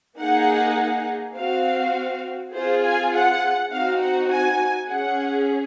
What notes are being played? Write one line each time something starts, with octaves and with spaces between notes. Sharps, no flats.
A#3 D#4 G#4 F#5
C4 F#4 F5
C4 F4 G#4 C5
G#5
F#5
C4 D#4 F#4 F5
F#5
G#5
C#4 G#4 F#5